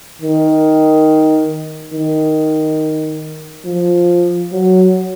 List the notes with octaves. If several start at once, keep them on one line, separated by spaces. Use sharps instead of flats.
D#3
D#3
F3
F#3